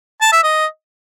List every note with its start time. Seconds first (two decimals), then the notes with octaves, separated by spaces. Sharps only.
0.21 A5
0.32 E5
0.43 D#5